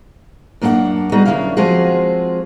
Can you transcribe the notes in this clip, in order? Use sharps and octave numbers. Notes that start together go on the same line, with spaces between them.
F#2 A#3 D4 G#4 F#5
G3 B3 D#4 F#4 G#4
F#2 D3 D#3 C#4 E4 F5
F3 G#3 C4 F4 F#4 G#4